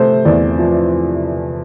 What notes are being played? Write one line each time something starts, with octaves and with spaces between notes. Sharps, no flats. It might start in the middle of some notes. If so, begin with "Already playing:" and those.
Already playing: C3 F3 A3 C5
E2 D5
F3